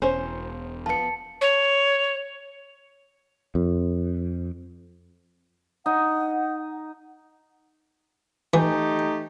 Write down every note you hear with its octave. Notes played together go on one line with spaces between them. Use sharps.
E1 C#4 C5 C#5
F3 B3 A5 C#7
C#5
F2
D#4 F#5
E3 A3 D#4 G4